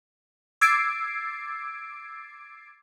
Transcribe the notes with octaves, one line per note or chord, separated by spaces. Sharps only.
D6 E6 G#6 A6 C7 D7